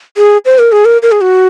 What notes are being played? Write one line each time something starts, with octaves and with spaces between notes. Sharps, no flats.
G#4
C5
A#4
G#4
A#4
A#4
G#4
F#4